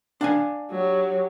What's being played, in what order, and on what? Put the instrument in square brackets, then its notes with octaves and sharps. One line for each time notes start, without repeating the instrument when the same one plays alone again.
[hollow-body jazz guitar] D4 F5 G#5
[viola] F#3 G4